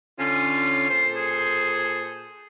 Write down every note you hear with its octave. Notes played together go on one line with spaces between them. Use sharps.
D3 C#4 F4
A#2 A4 C5 C6
G#4